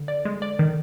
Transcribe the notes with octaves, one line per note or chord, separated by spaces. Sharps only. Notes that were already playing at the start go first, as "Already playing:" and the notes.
Already playing: D3
D5
G#3
D5
D#3